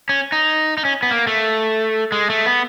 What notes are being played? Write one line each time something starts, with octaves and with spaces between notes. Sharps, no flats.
C#4
D#4
D#4
C#4
B3
A#3
A3
G#3
A3
B3